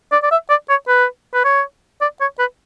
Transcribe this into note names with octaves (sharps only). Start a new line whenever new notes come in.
D5
D5
E5
D5
C#5
B4
B4
C#5
D5
C#5
B4